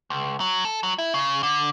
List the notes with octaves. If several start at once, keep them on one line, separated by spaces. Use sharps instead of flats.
C#2
F#3
A4
F#3
E4
C#3
D3